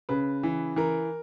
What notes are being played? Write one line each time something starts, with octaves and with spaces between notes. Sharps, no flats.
C#3 B4
E3
E3 A#4